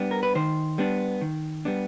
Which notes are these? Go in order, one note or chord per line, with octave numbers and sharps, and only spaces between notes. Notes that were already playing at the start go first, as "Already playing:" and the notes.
Already playing: G3 B3 D4
A#4
B4
D#3 C5
G3 B3 D4
D#3
G3 B3 D4